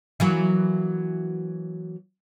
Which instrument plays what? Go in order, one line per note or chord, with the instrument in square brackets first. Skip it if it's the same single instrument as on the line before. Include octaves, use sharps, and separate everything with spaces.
[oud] E3 F#3 A#3